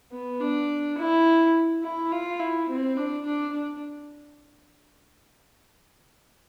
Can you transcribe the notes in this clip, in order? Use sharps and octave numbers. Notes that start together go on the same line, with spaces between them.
B3
D4
E4
E4
F4
E4
C4
D4
D4
D4